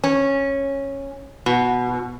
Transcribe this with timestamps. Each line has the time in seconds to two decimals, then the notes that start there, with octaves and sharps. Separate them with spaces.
0.04 C#4
1.46 B2